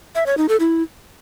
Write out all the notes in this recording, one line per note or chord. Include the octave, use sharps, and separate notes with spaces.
E5
C#5
D#4
A4
E4